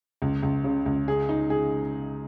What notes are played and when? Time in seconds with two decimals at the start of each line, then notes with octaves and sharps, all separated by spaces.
0.22 C#2
0.43 C#2
0.64 C#3
0.86 C#2
1.08 G#4
1.29 D#4
1.50 G#4